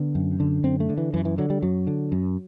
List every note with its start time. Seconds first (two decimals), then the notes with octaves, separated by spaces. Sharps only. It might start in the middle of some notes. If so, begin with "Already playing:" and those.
Already playing: D3 B3
0.15 F#2
0.40 D3
0.64 F#2 C4
0.80 A3
0.89 D3
0.98 E3
1.14 F#2 E3
1.25 E3
1.38 D3 F#3
1.50 G3
1.62 F#2 F#3
1.87 D3
2.12 F#2